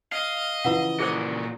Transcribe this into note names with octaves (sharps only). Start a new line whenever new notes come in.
D#5 F5
C#3 E3 F3 E4 B4 F#5
A#2 F#4 G#4 A4 C5